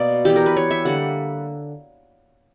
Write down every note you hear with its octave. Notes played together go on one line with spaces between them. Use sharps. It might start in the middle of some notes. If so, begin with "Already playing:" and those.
Already playing: B2 A#3 D5
E3 B3 G4
A#4
B4
C#5
E5
D3 G3 A#3 F#5